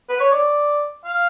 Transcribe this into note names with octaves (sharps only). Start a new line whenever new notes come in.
B4
C#5
D5
F5